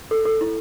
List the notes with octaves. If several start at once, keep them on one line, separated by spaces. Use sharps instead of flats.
A4
A4
E4